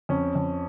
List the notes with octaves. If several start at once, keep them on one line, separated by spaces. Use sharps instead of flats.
F2 C#4
F2